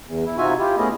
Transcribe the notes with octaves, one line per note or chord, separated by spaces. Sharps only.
E2
E4
C3 D#4 F4 F#4 E5 G#5
E4 F4 G4
A3 B3 C#4 E4 G#4 D#5